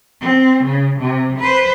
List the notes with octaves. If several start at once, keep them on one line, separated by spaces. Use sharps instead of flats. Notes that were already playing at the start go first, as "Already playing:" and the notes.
C4
C#3
C3
B4 C5